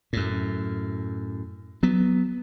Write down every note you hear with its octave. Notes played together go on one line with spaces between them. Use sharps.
F#2 A2
F#3 B3